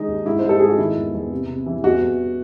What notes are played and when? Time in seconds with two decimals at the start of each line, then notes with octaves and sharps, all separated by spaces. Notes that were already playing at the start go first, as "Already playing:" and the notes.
Already playing: D#3 G#3 D#4
0.08 D#2
0.25 G#2 E4
0.39 G#2 C5
0.49 A4
0.59 G#2 G#4
0.69 F#4
0.78 D#3 E4
0.96 E2
1.14 E2
1.31 C3
1.49 C3
1.66 E3
1.84 E2 F#4
2.02 E2